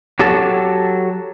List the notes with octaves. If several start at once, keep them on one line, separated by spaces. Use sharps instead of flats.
F#3 G4 A4 F#5 A5